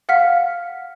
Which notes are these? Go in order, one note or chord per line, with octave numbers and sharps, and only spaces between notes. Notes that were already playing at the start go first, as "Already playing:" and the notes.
F5 F#5 F6 B6